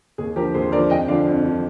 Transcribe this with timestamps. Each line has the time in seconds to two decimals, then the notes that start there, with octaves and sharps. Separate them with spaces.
0.18 D#2 G#4
0.36 D3 F3 G4 A#4
0.54 D#2 G#4 C5
0.72 D3 A#4 D5
0.76 F3
0.90 F2 D#5 G5
1.08 D3 F3 D5 F5
1.27 F2
1.44 D3 F3